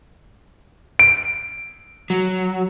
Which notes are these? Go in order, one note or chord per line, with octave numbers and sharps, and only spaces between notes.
D7
F#3